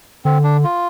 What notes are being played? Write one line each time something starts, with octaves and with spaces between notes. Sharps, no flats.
D3 C4
D4
F4